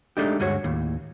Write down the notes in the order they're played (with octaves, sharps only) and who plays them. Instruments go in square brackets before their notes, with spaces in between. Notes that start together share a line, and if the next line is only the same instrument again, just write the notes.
[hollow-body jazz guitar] G#3 A3 D4 D#4 G4
D2 G2 G#3 F#4 C#5
D#2 A2